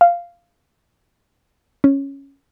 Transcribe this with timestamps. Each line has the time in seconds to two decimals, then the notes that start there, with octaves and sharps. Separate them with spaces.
0.01 F5
1.84 C#4